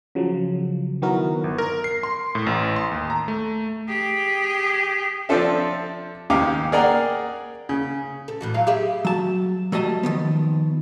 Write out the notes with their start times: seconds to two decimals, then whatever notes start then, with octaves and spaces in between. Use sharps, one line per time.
0.15 C#3 F3 F#3
1.02 D#3 F#3 B3 E4 F#4 A#4
1.44 G1
1.58 A#4
1.84 C7
2.03 C6
2.35 A2
2.47 A1
2.76 C6
2.91 D#2
3.10 A#5
3.28 A3
3.89 G4 G#4
5.29 F3 C4 D4 F4 A4 E5
6.30 D#2 G#2 C#3 G4 F5 D6
6.72 G#4 A#4 D5 F#5 G5 A#5
7.69 C#3
8.28 A4
8.41 A2 E3 F#4
8.54 F#3 F4 F5
8.67 G4 G#4 E5
9.05 F#3 A5
9.72 F#3 G3 A3 D#5 A5
10.03 D#3 F3 B3